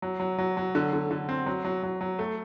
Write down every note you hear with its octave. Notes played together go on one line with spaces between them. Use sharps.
F#3
F#3
F#3
F#3
D3
D3
D3
C4
F#3
F#3
F#3
F#3
A3